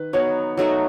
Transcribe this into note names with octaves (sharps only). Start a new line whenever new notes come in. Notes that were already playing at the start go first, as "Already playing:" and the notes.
Already playing: D#3 B4
F#3 B3 D#4 C#5
F#3 A3 D#4 F#4